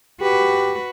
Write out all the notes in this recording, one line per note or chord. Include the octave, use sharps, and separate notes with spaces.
F#4 G4 B4